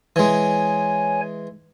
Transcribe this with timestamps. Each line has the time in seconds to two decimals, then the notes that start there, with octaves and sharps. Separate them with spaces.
0.16 E3 G#3 C#5 G#5